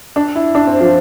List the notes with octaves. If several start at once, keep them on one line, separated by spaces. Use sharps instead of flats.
D4
E4
D4
C4
F3